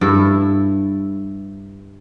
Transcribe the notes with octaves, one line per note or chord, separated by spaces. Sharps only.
G2 E4 A4